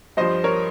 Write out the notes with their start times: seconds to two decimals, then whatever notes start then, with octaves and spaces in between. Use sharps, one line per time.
0.17 G2 F3 C5 D#5
0.44 A#4 C#5